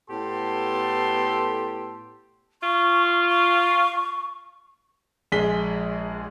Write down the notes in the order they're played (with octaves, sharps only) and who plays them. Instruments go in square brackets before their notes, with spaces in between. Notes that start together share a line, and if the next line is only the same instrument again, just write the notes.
[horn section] A2 B3 G4 A4 C6
[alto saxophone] F4 [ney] C#6
[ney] C#6
[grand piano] A#1 G#3 G#4 B6 G7